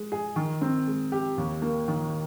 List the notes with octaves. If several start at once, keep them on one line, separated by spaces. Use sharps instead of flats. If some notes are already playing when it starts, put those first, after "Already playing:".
Already playing: G#3
G#4
D#3
C4
G#3
G4
D#2
A#3
D#3